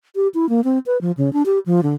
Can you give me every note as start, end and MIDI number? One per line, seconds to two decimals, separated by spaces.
0.15 0.28 67
0.34 0.49 64
0.49 0.61 58
0.64 0.79 60
0.86 1.00 71
1.01 1.12 53
1.17 1.33 49
1.33 1.43 62
1.46 1.59 67
1.66 1.81 53
1.83 1.94 50